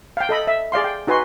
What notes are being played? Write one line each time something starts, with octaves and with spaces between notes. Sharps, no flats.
F5 G5
A4 D#5 B5
E5
G#4 D5 F5 C6
G5
D#4 F#4 B4 G#5 C6